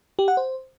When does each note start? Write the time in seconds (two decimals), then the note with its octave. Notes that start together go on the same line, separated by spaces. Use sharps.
0.19 G4
0.28 F#5
0.37 C5